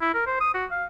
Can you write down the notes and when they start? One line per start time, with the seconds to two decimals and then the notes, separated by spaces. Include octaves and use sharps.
0.01 E4
0.14 A#4
0.27 C5
0.40 D#6
0.54 F#4
0.71 F5